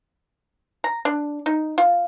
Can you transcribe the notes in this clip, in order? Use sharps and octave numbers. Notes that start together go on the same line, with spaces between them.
A#5
D4
D#4
F4